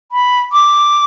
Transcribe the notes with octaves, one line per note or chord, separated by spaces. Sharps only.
B5
D6